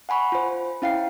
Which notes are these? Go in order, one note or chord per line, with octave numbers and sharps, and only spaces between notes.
F#5 G#5 B5 C#6
F4 C5
C#4 E4 F5 G5 C7